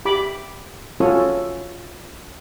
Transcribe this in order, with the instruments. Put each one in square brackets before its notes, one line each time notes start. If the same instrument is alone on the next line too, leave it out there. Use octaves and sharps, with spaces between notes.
[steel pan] G4 B5 D6
C#4 F4 F#4 A4 C#5 D#6